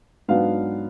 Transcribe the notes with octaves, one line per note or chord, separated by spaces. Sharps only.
G#2 F#3 B3 D4 F5